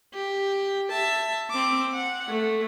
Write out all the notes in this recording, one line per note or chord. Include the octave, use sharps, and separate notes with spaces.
G4
E5 A5
C4 D6
F#5
A3